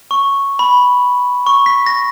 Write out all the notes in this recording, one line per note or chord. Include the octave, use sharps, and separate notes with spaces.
C#6
B5
C#6
B6
A#6